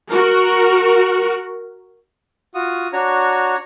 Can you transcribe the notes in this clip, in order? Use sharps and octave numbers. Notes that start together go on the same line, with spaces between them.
F#4 A#4
F4 F#4 D#6
D4 F#4 C#5 A#5